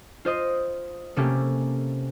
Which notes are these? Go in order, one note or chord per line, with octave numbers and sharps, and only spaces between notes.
F4 C5 D#5
C3 A3 A#3 C#4 G4